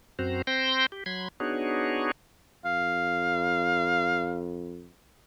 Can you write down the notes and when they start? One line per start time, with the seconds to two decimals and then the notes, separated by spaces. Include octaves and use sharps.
0.19 F#2 C4 F#4 C5 A#5
0.47 C4 C5 G5 C6 G6 A#6
0.92 G4
1.06 F#3 B5 C6 G#6
1.40 B3 D4 D#4 F#4 G#4 C#5
2.65 F2 F5